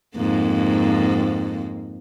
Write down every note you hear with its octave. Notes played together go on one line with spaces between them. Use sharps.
F2 G#2 A#3